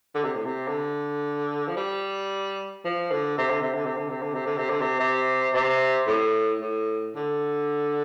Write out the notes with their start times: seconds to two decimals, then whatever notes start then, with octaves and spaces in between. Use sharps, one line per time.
0.15 D3
0.24 C3
0.35 A2
0.45 C3
0.68 D3
1.68 F3
1.77 G3
2.85 F3
3.12 D3
3.38 C3
3.51 D3
3.62 C3
3.74 D3
3.85 C3
3.97 D3
4.10 C3
4.23 D3
4.34 C3
4.46 D3
4.58 C3
4.70 D3
4.81 C3
5.00 C3
5.53 C3
6.07 A2
6.62 A2
7.16 D3